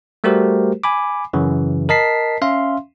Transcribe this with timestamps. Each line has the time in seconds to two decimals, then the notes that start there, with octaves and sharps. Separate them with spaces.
0.24 G3 A3 F#4 G4 A#4 C5
0.84 G#5 B5 D6
1.33 F#2 C#3 E3
1.89 A#4 D#5 A5 B6 C7
2.42 C#4 E5 F5 C6